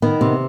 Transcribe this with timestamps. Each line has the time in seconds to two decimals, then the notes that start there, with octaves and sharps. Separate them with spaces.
0.02 D#3 B3
0.21 C3